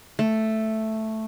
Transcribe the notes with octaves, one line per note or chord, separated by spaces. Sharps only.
A3